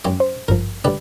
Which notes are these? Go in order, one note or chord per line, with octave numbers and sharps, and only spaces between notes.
F#2 G4 D6
C5
G#1 G2 F3 A#4
D3 G3 G4 B4 D5